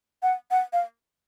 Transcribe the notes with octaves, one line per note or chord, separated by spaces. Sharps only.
F#5
F#5
F5